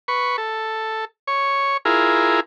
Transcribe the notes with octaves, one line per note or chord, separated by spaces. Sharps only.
B4 C#6
A4
C#5
E4 F4 G#4 A#4